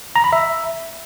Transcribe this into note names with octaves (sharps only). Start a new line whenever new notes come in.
A#5
B5
E5